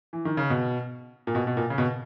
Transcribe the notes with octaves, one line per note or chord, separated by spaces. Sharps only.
E3
D#3
C#3
B2
A#2
B2
B2
A#2
C#3
B2